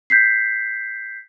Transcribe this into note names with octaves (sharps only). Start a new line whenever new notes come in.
G6 B6 C7